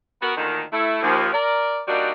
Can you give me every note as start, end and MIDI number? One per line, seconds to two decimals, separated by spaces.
0.22 0.34 59
0.22 0.34 66
0.22 0.34 70
0.36 0.62 38
0.36 0.62 46
0.36 0.62 50
0.36 0.62 51
0.72 1.01 57
0.72 1.01 64
1.03 1.31 39
1.03 1.31 53
1.33 1.81 70
1.33 1.81 74
1.88 2.12 55
1.88 2.12 58
1.88 2.12 62
1.88 2.12 63
1.88 2.12 66
1.88 2.12 74